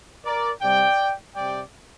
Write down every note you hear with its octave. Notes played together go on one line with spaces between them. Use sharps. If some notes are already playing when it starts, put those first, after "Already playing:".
A#4 D5
C3 G3 D5 G5
C3 G3 D5 G5